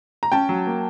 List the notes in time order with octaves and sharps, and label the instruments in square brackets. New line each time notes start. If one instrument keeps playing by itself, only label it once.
[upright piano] A#5
C#4 G5 A5
F#3
A#3